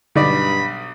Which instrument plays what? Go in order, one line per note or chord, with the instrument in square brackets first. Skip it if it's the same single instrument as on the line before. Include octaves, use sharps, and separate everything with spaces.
[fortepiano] B1 D5 [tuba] G2 [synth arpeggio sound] D3 D#4 C#6 [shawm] B5